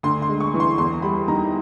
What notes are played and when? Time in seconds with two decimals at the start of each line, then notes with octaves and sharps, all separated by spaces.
0.03 D2 C6
0.22 C6
0.29 G#3
0.40 C#6
0.54 E3
0.60 C6
0.78 E2 C6
1.02 G3 B5
1.28 D#3 A#5